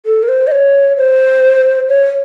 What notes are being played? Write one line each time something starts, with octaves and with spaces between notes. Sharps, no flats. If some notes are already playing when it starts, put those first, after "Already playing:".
A4
A#4
C5
D#5
C#5
C5
C#5